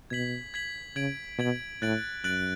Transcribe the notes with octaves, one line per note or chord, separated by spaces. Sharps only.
B2 G#6 B6 F#7
G#6 B6 F#7
C#3 G#6 D7 F#7
B2 G#6 D7 F#7
A2 F#6 A6 D7 F#7
F#2 F#6 A6 D7 F#7